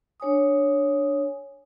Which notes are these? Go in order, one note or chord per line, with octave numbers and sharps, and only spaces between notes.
D4 C#5 G#5 D#6